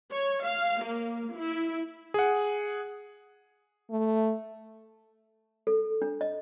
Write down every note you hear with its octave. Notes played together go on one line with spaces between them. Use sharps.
C#5
F5
A#3
E4
G#4 F#5
A3
A4
D4
D#5